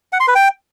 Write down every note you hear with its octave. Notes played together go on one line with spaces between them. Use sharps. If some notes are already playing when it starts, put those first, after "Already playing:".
F#5
C6
B4
G5